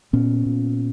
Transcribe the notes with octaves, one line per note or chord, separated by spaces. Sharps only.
A#2 B3 C#4
A#2